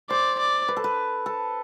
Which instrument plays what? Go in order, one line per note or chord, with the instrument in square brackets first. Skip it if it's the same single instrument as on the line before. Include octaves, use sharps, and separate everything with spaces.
[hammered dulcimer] C5 [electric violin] D5
[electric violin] D5
[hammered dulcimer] B4
A4
B4
A4